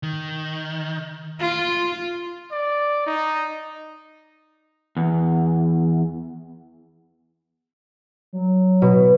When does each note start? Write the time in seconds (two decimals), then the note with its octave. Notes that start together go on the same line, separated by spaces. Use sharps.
0.03 D#3
1.40 F4
2.52 D5
3.07 D#4
4.97 E2
8.33 F#3
8.82 B2